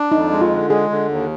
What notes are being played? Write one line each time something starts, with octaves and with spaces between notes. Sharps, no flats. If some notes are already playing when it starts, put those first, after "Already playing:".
Already playing: D4
F2 D#4
G#3
F4
D3
G#3 G#4
D3
D#2